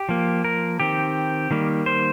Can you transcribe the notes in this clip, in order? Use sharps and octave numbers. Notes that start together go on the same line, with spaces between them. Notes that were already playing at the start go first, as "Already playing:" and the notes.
Already playing: G4
F3 A#3
A#4
D#3 C4 G4
D#3 G3 A#3
C5